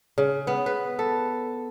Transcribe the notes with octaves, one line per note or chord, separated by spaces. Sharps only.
C#3
B3
B4
A4